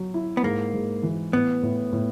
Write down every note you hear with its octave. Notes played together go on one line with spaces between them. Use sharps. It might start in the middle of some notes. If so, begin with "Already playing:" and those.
Already playing: F#3
E4
B3
G#2 A#3
G#2
E3
A2 B3
A2
A2